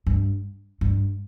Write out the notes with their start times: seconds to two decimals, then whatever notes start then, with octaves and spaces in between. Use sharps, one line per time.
0.06 G2
0.81 G2